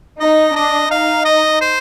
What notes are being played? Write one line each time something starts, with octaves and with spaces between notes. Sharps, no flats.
D#4 D#5
D4 D#5
D#4 F5
D#5
C5